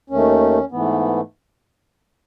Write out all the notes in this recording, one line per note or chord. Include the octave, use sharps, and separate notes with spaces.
D#2 D#3 A3 C#4
G#2 E3 A3 B3